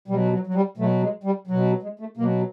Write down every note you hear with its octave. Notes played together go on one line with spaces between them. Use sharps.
B2 F#3 G3
F#3
F#3
G3
B2 F#3 A3
G#3
G3
B2 F#3
G#3
A3
B2 F#3 A#3